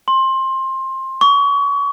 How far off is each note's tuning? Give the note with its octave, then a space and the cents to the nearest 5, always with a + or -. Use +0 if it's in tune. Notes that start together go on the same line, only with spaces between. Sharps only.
C6 +20
C#6 +35